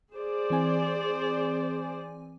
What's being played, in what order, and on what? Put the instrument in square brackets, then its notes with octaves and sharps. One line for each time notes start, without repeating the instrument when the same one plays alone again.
[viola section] G#4 C5 D5
[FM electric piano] E3 C4 G#5